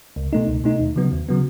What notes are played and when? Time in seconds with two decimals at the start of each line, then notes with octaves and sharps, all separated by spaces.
0.16 C#2
0.33 B2 A3 D#4
0.48 C#2
0.64 B2 A3 D#4
0.80 D#2
0.96 C#3 F#3 B3
1.12 D#2
1.29 C#3 F#3 B3